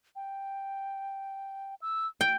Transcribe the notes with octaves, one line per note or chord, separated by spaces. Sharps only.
G5
E6
G5 D7